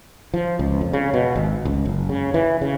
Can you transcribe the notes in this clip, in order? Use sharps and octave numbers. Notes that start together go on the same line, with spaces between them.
F3
C#2
F2
C#3
B2
G#1
C#2
F#1
C#3
E3
C#3